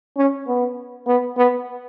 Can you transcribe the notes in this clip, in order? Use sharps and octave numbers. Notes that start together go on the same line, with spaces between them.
C#4
B3
B3
B3